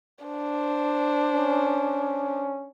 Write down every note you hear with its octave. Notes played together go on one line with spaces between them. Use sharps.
D4 C5
C#4